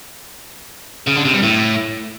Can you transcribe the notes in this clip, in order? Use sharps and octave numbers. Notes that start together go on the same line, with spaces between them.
C#3
D3
C3
G2
A2